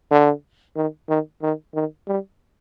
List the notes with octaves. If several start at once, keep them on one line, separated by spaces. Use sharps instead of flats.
D3
D#3
D#3
D#3
D#3
G3